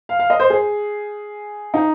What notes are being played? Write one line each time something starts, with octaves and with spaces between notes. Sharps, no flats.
F5
F5
D#5
C5
G#4
D#4